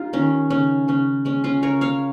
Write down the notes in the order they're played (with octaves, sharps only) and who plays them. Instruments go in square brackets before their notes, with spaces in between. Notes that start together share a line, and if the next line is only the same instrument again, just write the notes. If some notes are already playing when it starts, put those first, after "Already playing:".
Already playing: [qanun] D#4 F4 G4
D#3 C#4
C#3 C#4
C#3 C#4
G#3 C#4
C#4 F4
C#3 A#4 C#5
C#5 F5